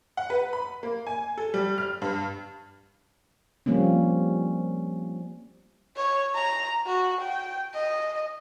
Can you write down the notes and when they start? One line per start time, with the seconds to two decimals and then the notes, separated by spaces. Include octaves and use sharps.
0.17 F#5
0.30 B4
0.53 B5
0.83 A#3
1.07 G#5
1.38 A4
1.54 G3
1.78 F6
2.02 G2
3.66 F3 G3 A#3 C4 C#4
5.97 C#5
6.35 A#5
6.86 F#4
7.21 G5
7.74 D#5